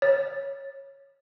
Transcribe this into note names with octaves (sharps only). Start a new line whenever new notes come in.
C#5